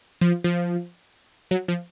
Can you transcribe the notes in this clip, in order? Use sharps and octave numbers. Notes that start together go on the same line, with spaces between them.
F3
F3
F#3
F3